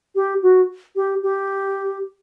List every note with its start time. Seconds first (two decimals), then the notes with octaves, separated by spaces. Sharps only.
0.15 G4
0.43 F#4
0.96 G4
1.23 G4